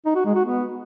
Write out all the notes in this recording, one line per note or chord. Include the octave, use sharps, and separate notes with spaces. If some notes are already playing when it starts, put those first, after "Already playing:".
D#4
F#4
G#3
F#4
B3